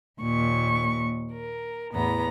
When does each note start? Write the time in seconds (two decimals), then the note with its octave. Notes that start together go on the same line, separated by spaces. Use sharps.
0.21 D#2 A#2 C#6
1.32 A#4
1.93 E2 A2 B3 A#5